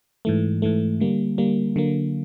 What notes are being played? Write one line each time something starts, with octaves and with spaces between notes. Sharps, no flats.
G#2 E3 A3
G#2 E3 A3
D3 G3 A#3
D3 G3 A#3
D3 F#3 A#3